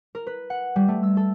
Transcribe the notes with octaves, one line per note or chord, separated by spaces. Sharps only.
A#4
B4
F#5
G3
A3
E6
A4